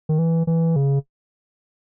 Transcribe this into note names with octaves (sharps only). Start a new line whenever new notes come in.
D#3
E3
E3
C#3